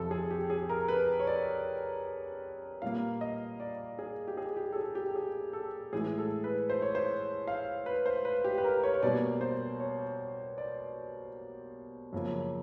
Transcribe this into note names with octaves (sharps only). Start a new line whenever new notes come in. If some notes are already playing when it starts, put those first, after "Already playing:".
Already playing: F2 C3 F3 A4
G#4
G4
G#4
A#4
B4
C#5
D5
A#2 G3 A#3 F5
D#5
D5
G#4
G4
G#4
G4
A4
G#4
G4
A4
G#4
A4
A2 E3 G#3 G#4
A4
B4
C5
C#5
C5
F5
B4
C5
B4
G4
B4
A#4
C#5
C#5
B2 G3 A#3 D5
C5
C#5
D5
F#2 C#3 F3 A#3